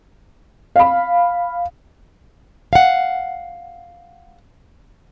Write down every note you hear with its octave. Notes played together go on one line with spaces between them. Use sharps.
F5 B5
F5 F#5